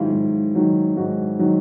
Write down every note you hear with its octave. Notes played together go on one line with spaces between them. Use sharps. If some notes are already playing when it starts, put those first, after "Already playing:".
Already playing: G#2 D#3 F#3 E4 F4
G#2
D#3 F#3
G#2 F#4
D#3 F#3